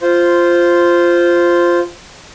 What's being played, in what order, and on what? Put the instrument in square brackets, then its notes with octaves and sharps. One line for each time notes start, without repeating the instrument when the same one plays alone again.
[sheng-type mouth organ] F4 C5